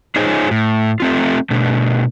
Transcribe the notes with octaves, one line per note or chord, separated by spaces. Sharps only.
D#4 F4 G#4 C5 C#5
A2
A3 C4 F4
B2 A3 D4